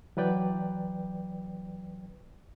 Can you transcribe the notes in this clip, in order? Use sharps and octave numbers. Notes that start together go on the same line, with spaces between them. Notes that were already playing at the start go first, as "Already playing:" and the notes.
E3 F#3 B4 D5 G5